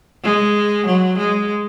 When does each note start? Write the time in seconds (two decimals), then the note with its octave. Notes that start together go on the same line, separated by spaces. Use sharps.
0.23 G#3
0.86 F#3
1.18 G#3